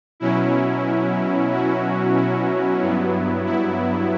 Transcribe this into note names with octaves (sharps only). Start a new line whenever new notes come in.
B2 F#3 C#4 E4
F#4
E4
E4
G2 F#3 B3
E4